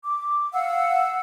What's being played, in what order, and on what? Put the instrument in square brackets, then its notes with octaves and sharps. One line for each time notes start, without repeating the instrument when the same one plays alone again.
[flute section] D6
F5 F#5 E6